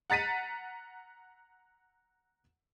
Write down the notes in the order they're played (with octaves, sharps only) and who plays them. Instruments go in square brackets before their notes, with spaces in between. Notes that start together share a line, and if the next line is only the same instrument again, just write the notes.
[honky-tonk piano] F#5 A#5 A6 B6 D#7